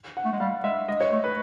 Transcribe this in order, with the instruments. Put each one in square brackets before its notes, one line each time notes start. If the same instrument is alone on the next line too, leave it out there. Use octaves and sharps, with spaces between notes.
[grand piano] F#5
[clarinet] A3
G#3
[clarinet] G3 [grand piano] F5
[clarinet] G#3 [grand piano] E5
[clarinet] G#3 [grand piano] D#5
[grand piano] C#5
[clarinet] A3
[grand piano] B4